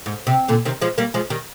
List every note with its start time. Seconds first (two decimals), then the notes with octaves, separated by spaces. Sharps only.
0.06 G#2
0.27 C3
0.48 A#2 D3
0.65 C3 D#3
0.81 F3 G#3
0.98 G3 A#3
1.14 F3 G#3
1.30 D#3 G3